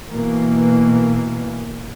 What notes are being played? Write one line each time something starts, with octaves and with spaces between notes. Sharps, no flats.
B2 E3 A#3